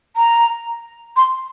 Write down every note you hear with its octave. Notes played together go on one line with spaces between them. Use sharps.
A#5
C6